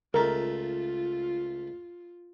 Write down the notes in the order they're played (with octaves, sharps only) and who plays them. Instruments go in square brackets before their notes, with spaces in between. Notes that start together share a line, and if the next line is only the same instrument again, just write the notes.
[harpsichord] C#2 A3 [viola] F4 [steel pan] A#4